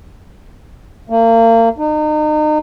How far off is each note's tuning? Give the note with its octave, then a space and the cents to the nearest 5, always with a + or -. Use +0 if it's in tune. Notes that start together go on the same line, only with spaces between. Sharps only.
A#3 -35
D#4 -35